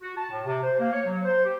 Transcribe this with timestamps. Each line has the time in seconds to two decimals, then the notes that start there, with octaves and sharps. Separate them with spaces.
0.02 F#4
0.17 A5
0.30 A2
0.45 C3
0.63 C5
0.79 A#3
0.92 C#5
1.05 F#3
1.25 C5
1.44 G4